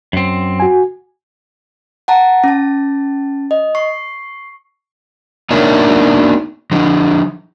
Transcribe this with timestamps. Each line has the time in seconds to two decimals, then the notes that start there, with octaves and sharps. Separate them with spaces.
0.13 F#2 C4
0.60 F#4 G#5
2.08 F#5 A5 A#5
2.44 C#4 A5
3.51 D#5
3.75 C#6 C7
5.51 A#3 D4 D#4 A#4 C#5 E5
6.71 D3 F3